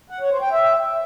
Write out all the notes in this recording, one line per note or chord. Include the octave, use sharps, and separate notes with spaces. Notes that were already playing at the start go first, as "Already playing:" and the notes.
F#5
C#5
C5
G5
E5